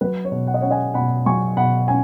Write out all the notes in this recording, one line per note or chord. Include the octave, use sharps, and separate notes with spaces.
F#3 B4
C#5
B2
F#5
D#5
C#4 C#5 F#5
D#5 G#5
B2 F#5 B5
F#3 G#5 C#6
B2 F#5 B5
C#4 G#5